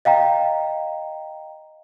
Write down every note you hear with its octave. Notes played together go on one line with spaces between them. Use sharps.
D#5 F5 G5 A#5